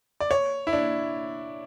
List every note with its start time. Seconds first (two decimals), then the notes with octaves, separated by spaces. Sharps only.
0.20 D5
0.31 C#5
0.67 E4
0.73 D4